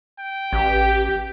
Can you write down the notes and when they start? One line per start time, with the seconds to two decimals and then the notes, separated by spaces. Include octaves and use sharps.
0.20 G5
0.53 A1 G4